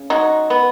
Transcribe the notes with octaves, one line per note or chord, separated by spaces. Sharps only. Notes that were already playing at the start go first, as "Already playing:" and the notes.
Already playing: C#3
G#3 D#4 F#4
B3